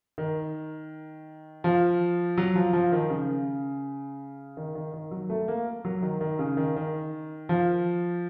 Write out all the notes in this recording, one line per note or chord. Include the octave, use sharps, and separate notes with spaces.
D#3
F3
F#3
F3
F3
D#3
C#3
D#3
D#3
D#3
F#3
A3
A#3
F#3
D#3
D#3
C#3
D#3
D#3
F3